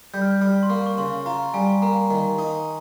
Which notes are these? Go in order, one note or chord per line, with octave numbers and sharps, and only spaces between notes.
G3 G6
F6
G6
G3 F6
C6
A#3 C#6
C#6
C#3 C6
F4 A#5
G3 G#5
A#3 A#5
D#3
D#4